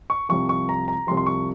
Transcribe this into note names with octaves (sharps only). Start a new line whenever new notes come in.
C#6
C2 C3 F3 C#6
C#6
A#5
A#5
C2 C3 F3 C6
C6
C#6